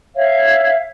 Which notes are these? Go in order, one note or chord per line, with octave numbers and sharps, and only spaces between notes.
C#5 E5 F5